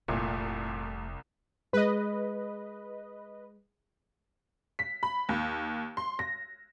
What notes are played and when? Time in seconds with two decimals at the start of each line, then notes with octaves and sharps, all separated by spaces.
0.08 F1 C2 A#2 A3
1.73 G#3 B4 D#5
4.79 B6
5.03 B5
5.29 D#2
5.97 C6
6.19 A#6